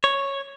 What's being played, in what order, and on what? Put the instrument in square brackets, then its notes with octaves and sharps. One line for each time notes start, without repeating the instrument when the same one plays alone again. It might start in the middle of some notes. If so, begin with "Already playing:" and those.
[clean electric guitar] C#5